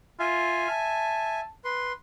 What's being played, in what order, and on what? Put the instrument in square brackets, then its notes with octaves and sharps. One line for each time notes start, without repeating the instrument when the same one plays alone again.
[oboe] F4 [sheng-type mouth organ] E5 G#5
[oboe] A5
[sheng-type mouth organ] B4 C6